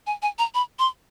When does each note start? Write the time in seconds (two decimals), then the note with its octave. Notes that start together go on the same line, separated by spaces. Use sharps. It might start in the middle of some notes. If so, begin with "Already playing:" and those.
0.07 G#5
0.22 G#5
0.39 A#5
0.55 B5
0.79 C6